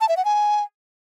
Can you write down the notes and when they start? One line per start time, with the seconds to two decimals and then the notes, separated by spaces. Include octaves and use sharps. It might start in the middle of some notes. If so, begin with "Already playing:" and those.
0.01 A5
0.09 E5
0.17 F#5
0.25 G#5